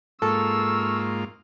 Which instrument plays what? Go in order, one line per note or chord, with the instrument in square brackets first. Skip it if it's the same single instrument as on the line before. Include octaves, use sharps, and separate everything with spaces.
[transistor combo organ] G#2 A#3 F4 [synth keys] A4 [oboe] C#6 [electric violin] E6